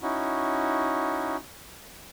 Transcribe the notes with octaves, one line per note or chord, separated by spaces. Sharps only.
C#4 D#4 E4 F#4